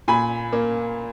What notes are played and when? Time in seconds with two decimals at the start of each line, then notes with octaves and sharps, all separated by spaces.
0.08 A#2 G#5 B5
0.52 A#3